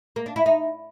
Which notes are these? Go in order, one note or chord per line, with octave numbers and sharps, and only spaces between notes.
A#3
D4
E4
D#4